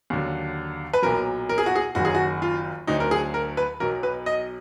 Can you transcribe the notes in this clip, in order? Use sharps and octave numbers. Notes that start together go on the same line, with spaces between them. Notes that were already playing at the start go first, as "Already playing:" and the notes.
D#2 D3 F#3
B4
B1 A#2 F#3 A#4
A#4
G#4
F#4
G#4
F#1 F#2 D#3 F#3 F#4
G#4
F#4
F4
D2 D3 F#3 D#4
A#4
G#4
A#4
B4
B1 B2 F#3 A#4
B4
D#5